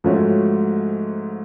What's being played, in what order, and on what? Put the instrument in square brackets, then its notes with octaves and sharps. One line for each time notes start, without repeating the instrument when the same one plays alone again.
[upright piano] G#2 F3 A3 C#4 F#4